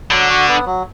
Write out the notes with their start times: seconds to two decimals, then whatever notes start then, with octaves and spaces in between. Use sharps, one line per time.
0.11 D3 F#3
0.29 F#4
0.48 B3
0.66 F#3